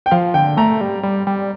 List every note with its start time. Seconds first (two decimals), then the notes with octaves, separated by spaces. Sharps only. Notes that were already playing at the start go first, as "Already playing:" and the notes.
0.06 G5
0.11 F3 F5
0.34 D3 G5
0.57 A3 A#5
0.81 G3
1.03 G3
1.27 G3